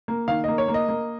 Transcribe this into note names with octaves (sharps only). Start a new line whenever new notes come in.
A#3
D#3 F5
A#3 D#5
C#5
A#3
D#5
A#3